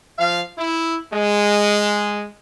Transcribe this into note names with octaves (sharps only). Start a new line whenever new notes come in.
F3 F5
E4
G#3